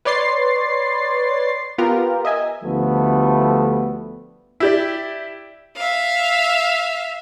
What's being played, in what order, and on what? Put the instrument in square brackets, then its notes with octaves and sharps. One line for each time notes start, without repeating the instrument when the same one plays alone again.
[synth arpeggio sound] B4 C#5 D5 C6 A6 C7
B3 F4 G4 A#4
D#5 E5 G#5
[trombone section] D2 D3 F3 G3 A3 B3
[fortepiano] E4 G4 D5
[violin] E5 F5